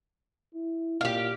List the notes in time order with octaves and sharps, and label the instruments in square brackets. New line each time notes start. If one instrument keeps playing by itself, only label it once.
[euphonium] E4
[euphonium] A#2 [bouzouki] G4 F5